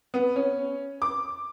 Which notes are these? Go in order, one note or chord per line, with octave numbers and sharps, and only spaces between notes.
B3
C#4
D6